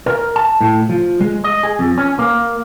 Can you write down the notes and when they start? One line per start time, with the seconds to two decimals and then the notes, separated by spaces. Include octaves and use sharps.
0.06 A#4
0.36 A5
0.61 A2
0.89 F3
1.21 G#3
1.44 D#5
1.63 G#4
1.79 F2
1.98 C#4
2.19 A#3